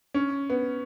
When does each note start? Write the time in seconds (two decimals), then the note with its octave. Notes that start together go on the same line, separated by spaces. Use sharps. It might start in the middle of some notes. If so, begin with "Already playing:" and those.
0.14 C#4
0.50 B3